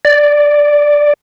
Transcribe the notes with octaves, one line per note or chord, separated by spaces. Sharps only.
D5